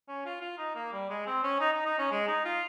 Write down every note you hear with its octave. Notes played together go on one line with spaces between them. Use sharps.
C#4
F4
F4
D#4
A#3
G3
G#3
C4
C#4
D#4
D#4
D#4
C#4
G#3
D#4
F4